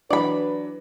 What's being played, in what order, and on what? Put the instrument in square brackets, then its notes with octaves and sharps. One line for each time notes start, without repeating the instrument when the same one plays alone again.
[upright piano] E3 F#3 D4 [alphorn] B4 [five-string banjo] D5 B5